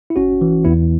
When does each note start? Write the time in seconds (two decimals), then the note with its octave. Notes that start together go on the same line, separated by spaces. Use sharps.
0.10 E4
0.16 G#1 C#4 F#4
0.41 E3
0.65 E2 B3 E4